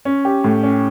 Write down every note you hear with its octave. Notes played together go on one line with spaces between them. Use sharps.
C#4
G4
A2
C#4